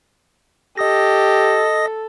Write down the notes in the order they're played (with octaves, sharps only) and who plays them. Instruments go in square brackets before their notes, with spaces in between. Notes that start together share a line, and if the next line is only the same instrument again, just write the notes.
[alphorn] G4 [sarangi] A4 [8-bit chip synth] D#5 D#6 A#6